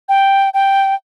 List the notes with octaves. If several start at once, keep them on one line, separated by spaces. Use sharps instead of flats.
G5
G5